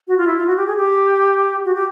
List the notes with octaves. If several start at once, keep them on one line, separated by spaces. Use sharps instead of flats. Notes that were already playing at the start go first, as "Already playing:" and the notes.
F#4
F4
E4
F4
F#4
G4
G#4
G4
F#4
G4